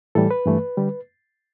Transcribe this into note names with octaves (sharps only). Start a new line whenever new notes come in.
A2 E3 G3 A4
B4
G2 E3 A3
D3 G3